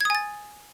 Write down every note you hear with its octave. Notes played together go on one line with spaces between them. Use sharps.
G#5 D#6 G#6 A6